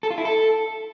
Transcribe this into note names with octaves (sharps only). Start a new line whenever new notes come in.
A4
F4
E4
A4